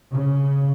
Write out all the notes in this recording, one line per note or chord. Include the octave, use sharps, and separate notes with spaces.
C#3